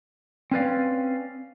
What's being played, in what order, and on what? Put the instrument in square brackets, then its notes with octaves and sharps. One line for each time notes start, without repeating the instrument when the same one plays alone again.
[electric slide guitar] C4 C#4 B4 D5 F5